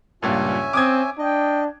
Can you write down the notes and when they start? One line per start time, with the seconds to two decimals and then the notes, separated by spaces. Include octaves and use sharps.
0.23 C#2 G2 A#2 C#4 F4 E5 G#5
0.73 C4 D6 D#6 G#6
1.19 D4 D#5 G5